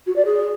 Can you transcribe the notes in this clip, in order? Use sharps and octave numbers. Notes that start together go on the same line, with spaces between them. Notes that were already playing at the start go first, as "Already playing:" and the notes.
F#4
D5
G#4